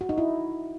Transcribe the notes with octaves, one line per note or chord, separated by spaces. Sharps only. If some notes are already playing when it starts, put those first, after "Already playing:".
F#4
D#4
E4